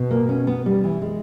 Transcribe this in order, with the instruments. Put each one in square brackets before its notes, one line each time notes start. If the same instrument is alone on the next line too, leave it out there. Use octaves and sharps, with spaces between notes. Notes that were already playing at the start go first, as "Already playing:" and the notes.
Already playing: [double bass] B2
[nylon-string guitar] A#3
C#4
B3
G3
E3
G#3